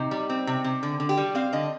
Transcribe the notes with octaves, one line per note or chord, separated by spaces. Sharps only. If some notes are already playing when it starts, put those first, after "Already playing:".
Already playing: C3 D#4
G3
C4
C3
C3
D3
D3
G4
G3
C4 F5
D3 D#5